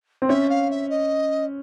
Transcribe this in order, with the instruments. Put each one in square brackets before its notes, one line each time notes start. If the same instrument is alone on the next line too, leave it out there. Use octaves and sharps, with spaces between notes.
[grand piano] C4
[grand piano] C#4 [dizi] E5
[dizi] F5
E5
D#5